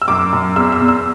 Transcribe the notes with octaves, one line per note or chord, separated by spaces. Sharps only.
E6
F#2 D6
F#2
E2 E6
E6
E2
E6